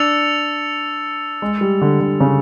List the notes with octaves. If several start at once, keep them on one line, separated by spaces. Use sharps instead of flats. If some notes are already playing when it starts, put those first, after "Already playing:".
Already playing: D4 E6 A6 C#7 F7
G#3
G3
D3
D3
C#3